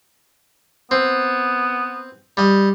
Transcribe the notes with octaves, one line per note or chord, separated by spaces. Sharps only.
B3 C4
G3 D#5